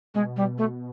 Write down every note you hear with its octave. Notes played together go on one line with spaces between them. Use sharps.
B2 G#3
G3
A3